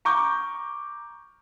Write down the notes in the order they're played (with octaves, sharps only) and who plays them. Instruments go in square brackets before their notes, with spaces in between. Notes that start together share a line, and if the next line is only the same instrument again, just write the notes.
[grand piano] A#5 C#6 D6 G6